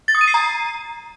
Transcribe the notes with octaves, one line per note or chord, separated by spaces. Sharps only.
A6
D#6
D#7
C7
A#5